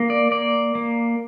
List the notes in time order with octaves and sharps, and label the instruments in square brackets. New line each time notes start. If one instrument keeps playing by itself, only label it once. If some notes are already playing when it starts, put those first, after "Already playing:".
Already playing: [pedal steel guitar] A#3
D5
A#3 D5
A#3